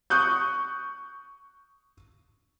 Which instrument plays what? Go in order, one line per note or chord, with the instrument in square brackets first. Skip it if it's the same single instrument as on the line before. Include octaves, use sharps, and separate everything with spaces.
[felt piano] C#6 D#6 F#6 G6